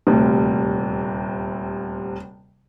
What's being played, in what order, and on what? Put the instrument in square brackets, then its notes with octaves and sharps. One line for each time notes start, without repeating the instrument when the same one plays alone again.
[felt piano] D#1 D2 C3